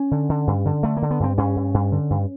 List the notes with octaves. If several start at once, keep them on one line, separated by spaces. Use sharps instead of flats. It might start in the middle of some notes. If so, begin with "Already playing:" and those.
Already playing: C#4
D3
D3
G2
D3
D3 A3
A#3
D3
B3
G2 C4
G2 C#4
G2
G2
D3
G2